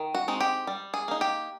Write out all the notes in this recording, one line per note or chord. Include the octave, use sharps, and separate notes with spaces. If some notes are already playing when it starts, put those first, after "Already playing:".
Already playing: D#3
F#4
G#3 C4 D#4
G4
G3
G#4
A#3 D#4
G4